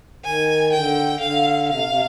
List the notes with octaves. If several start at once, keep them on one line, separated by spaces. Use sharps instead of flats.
D#3 G#5
D3 G5
D3 F5
C3 F5
C3